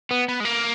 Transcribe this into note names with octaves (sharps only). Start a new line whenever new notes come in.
B3
B3
G#3
A#3